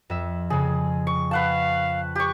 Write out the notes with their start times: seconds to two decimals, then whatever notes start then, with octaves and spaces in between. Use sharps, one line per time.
0.10 F2 E5
0.50 F2 C#3 G#4
1.07 C#6
1.31 B4 F5 F#5 A5
2.15 G4 C#6